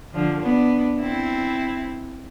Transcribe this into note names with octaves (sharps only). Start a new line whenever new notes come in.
D3 F3
B3 D4
C4 E4